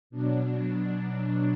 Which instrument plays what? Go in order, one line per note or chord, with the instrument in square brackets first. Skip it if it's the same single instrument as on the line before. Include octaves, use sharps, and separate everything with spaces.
[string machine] B2 F#3 D4
D4